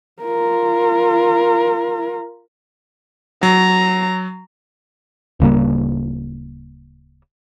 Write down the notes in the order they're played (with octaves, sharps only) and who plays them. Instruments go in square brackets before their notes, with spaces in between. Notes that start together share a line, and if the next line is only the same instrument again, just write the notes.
[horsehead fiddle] F4 A#4
[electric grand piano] F#3 [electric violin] A#5
[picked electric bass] D1 C#3 G3 A#3